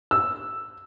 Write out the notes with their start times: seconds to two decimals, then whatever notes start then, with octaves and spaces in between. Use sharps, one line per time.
0.11 E6